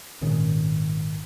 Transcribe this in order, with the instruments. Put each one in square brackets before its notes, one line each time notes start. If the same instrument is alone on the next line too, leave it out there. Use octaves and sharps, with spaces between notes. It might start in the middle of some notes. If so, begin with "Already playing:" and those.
[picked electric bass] G#1 A#2 D#3 C#4